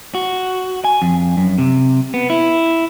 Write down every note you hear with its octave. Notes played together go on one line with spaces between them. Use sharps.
F#4
G#5
F2
F#2
C3
B3
E4